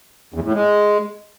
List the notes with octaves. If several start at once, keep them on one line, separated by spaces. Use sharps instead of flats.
E2
A2
G#3